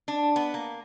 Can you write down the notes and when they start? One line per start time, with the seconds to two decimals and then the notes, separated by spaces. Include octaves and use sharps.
0.08 D4
0.36 B3
0.54 A#3